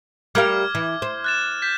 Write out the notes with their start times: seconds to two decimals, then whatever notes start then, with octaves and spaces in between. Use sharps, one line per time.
0.35 G3 A#4 F5 D6 F6 G#6
0.75 E3
1.02 C5
1.24 F#6 A6 E7
1.62 G6 B6